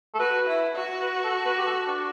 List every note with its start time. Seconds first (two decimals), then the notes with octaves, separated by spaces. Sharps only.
0.14 A4
0.19 F#4 B4
0.47 E4
0.75 F#4
1.02 B4
1.24 A4
1.46 B4
1.59 G4
1.66 A4
1.87 D4